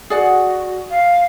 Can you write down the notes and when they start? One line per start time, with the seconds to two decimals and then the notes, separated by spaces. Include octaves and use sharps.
0.10 F#4 G#4 D5 F#5
0.90 F5